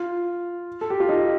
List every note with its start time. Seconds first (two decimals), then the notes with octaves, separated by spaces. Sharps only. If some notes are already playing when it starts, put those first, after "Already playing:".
Already playing: F4
0.81 A4
0.90 G4
1.00 F4
1.09 D#4